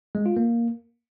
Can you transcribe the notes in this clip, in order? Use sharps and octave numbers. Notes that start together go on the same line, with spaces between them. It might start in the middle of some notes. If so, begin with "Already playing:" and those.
G#3
F4
A#3